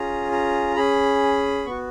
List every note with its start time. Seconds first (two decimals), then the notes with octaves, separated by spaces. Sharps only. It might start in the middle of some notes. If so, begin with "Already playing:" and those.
Already playing: C#4 F4 G#4 A#5
0.32 A#5
0.76 C#4 G#4 B5
1.66 B3 F#4 C#6